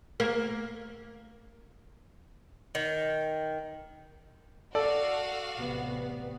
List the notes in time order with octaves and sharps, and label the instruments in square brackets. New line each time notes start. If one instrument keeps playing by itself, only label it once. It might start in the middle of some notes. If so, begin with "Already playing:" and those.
[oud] A#3
[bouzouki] D#3
[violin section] F#4 F5 F#5 [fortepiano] A4 [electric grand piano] D5
[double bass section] A1 C3 B3